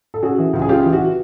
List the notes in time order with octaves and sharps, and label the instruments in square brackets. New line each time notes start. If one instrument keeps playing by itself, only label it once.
[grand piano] A4
C#3 F#4 G#4
E3
C#2
G#4
C#3 F4 G4
E3
F#4